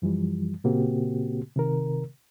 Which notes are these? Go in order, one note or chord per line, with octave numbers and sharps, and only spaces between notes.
F#2 E3 F3 G3
A#2 C#3 A#3 C4 F#4 G4
C3 D#3 A#4